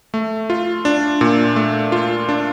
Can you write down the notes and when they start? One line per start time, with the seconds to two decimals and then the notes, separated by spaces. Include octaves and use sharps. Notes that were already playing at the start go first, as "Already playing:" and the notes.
0.14 A3
0.50 F4
0.85 D4
1.21 A#2
1.56 A3
1.92 F4
2.29 D4